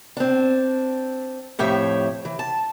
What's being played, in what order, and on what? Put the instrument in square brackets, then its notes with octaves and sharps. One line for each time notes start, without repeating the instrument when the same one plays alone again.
[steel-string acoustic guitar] C4 D4
F2 A2 G4 C#5 E5
E3
A5